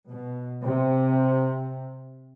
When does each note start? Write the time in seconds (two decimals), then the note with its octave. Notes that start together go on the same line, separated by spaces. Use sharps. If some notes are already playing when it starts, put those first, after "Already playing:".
0.11 B2
0.65 C3